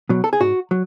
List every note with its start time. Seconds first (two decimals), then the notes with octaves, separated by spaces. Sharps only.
0.09 B2 F#3
0.24 A4
0.33 G#4
0.40 G#2 F#4
0.71 F#3